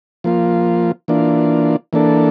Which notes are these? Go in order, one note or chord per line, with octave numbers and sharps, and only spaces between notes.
F3 A#3 F4
E3 A#3 D4 F4
E3 A#3 D4 A4